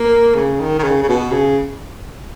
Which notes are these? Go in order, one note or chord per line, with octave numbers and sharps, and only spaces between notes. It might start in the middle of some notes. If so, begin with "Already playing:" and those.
Already playing: A#3
C#3
D#3
D#3
C#3
C#3
B2
C#3